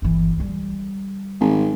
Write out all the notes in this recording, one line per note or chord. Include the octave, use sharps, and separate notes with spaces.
G1 E3
D3 G3
G#1